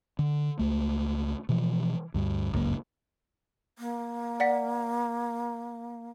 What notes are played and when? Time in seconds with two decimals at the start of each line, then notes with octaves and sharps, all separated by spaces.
0.19 D3
0.59 C#2 A3
1.49 B2 E3 F3
2.14 D2 G2
2.52 G1 C#2 F#2 A#3
3.79 A#3
4.40 D5 F#5 B6